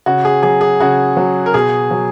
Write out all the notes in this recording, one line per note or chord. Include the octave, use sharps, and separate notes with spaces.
C#3 F#4
G#4
F#3 G#4
G#4
C#3 F#4
F#3
A#4
B2 G#4
F#3